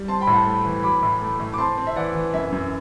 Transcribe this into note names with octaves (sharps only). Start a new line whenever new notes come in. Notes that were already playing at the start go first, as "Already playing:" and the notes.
Already playing: G3
C4 A5 C6
G5 B5
A2
F#5 A5
A3
E3
F#3 B5 D6
A2
A3
A2
D6
C4 A5 C6
C4
E5
E3 D5 F#5
E3
F#2 E5
F#2